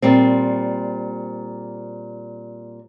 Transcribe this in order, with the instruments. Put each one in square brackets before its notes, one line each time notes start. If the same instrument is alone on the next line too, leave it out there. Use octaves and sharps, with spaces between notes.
[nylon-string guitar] A#2 G3 C4